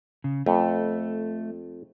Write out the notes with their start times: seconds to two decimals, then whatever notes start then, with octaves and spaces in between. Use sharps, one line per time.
0.24 C#3
0.46 F2 A3